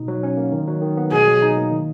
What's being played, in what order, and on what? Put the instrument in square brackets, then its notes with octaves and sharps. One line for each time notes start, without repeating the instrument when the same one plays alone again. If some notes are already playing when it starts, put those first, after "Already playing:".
Already playing: [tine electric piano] B2 D#4
F#3
C#4
A#3
D#3
F#3
D#3
B3
[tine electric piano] B2 [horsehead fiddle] G#4
[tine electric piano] F#3
D#4
A#3
D#3